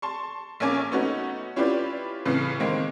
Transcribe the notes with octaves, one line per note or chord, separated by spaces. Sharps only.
A5 C6 C#6
A#1 A#3 C#4 G#5 D6
A3 B3 C#4 D#4 F#4
C#4 E4 F4 G4 B4 D5
C2 A2 C#3 E3
D#3 G#3 A#3 C4